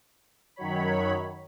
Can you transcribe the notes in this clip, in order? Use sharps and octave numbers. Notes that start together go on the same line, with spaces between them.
F#2 D#3 F#3 C#5 B5